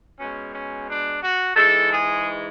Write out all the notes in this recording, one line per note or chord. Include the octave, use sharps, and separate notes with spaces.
B2 G#3 C#4
C#4
D4
F#4
G#2 E3 G#3 A4
G#4